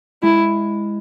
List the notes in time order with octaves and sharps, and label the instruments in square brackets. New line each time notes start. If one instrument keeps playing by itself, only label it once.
[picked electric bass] G#3 [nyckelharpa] E4